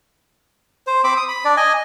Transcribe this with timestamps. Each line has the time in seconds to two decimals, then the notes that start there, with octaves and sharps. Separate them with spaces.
0.87 C5
1.04 C4 B5 D6
1.17 D#6
1.28 B5
1.45 D4 D5
1.57 D#5 G#5